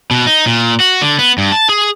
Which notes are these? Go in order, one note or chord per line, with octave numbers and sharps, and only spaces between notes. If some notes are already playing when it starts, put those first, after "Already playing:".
B2
D#4
A#2
F#4
D3
B3
G2
A5
G#4